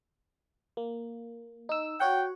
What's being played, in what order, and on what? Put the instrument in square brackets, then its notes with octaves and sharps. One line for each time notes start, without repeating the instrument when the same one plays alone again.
[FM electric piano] A#3
D#4 E6
[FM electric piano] F#4 C#5 F#5 [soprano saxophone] G5